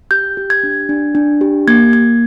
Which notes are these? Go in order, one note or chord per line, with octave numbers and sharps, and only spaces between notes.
G4 G6
G4
G#6
D4
D4
D4
G4
A#3 G#6
A#3 G#6